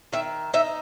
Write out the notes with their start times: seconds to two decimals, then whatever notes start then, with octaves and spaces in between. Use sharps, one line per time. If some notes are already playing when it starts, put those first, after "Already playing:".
0.13 D#3 E5
0.54 D#4 E5